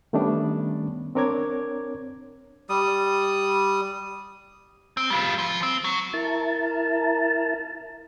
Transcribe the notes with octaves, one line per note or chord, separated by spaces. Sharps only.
D#3 G3 A3 B3 C#4 D4
C4 D4 A#4 C#5 D6 G#6
G3 D#6
C4
G3 F4
F3
C4
F#3
E4 A#4 A5